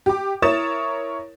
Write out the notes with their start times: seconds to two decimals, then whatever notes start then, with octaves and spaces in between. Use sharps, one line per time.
0.06 G4 D6
0.42 E4 A#4 C#5 D#6 A6 E7